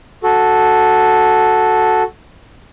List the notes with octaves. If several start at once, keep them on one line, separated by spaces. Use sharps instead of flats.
F#4 A4